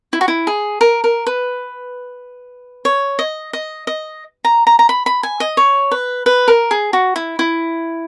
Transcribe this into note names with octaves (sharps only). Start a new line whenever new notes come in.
E4
F#4
E4
G#4
A#4
A#4
B4
C#5
D#5
D#5
D#5
A#5
A#5
A#5
B5
B5
G#5
D#5
C#5
B4
B4
A#4
G#4
F#4
E4
E4